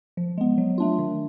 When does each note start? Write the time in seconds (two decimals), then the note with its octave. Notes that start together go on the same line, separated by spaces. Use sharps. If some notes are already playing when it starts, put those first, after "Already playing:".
0.17 F3
0.38 G#3 B3
0.58 F#3
0.78 A3 D4 F4
0.99 D#3